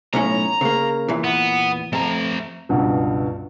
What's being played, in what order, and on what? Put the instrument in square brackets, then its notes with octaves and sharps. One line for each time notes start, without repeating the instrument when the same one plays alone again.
[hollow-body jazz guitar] B1 A2 C#4 [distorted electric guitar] A#5
[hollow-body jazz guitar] C#3 A#3
E2 A#2 E3
[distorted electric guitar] B3
[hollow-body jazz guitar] F2 [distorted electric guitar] A3 A#5
[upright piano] C#2 G2 B2